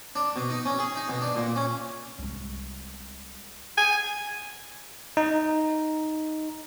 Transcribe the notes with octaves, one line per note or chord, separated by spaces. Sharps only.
D4
B2
D#4
C#4
G#4
D#4
B2
D4
A#2
C#4
C2 G#3
G#5
D#4